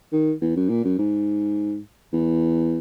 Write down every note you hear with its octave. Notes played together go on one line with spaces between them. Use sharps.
D#3
E2
F#2
A#2
F#2
G#2
E2